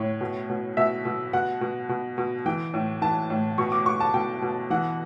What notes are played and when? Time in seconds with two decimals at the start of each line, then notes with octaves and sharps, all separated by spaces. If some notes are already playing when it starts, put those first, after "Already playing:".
Already playing: A2 C#5
0.21 B2
0.50 B2
0.77 B2 E5
1.05 B2
1.33 B2 F#5
1.61 B2
1.89 B2
2.18 B2
2.46 E3 G5
2.74 A2
3.02 E3 A5
3.30 A2
3.58 B2 C#6
3.72 D6
3.86 B2 C#6
4.00 A5
4.14 B2 G5
4.42 B2
4.70 E3 F#5